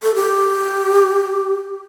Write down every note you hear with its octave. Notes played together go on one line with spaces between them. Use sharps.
A4
G4